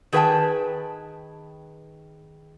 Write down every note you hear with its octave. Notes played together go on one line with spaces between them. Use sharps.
D#3 G#4 B4 C5 G5 A5